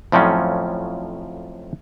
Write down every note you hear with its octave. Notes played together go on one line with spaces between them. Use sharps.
F2 A2 F3 F#3 C#4